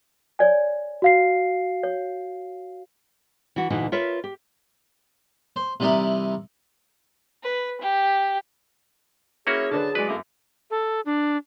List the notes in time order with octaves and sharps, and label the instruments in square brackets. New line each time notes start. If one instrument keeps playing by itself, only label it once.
[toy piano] C#5 D5 G#5
[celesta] F#4 F5 C7
[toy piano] C#5
[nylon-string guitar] E3 F#4
D2 A#2 E3 D#4 F#4
F4 A#4 B4 C#5 E5
G4
[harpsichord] C5
C3 E3 G3 D#4 E4 A#4
[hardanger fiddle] B4
G4
[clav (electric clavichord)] A#3 C#4 F#4 [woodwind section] E4 C#5 [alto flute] G#4
[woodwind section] F#2 A5 [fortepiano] D3 D4 B4
[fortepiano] F#3 G#3 [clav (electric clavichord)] B4 [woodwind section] D5
[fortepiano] F#2 D6 [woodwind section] A3 A#3
[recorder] A4
D4